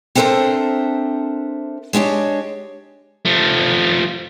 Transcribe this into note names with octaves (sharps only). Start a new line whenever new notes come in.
C4 D4 A4 A#4 C5 E5
G#3 D4 G4 C#5
F3 A3